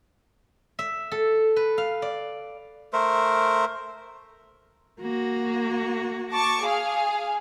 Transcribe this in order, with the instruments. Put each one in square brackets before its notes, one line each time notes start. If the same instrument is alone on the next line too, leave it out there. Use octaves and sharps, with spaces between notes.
[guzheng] E5
A4
B4
F5
D5
[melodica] A3 A#4 C5
[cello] A#3 F#4
[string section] A5 C#6 D6
G#4 F5